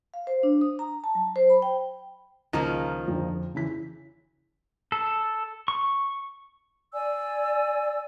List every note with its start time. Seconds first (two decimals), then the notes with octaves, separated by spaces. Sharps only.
0.14 F5
0.27 C5
0.43 D4
0.61 D#6
0.79 A#5
1.04 A5
1.15 F#3
1.36 C5
1.50 B5
1.62 G5
2.53 C#2 D#3 F3 A#3
3.08 F2 D3
3.55 C#3 E3 B6
4.92 A4
5.68 C#6
6.93 D5 G#5 E6